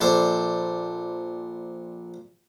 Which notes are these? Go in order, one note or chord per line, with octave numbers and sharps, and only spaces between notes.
A#1 D4 A4 C5 C6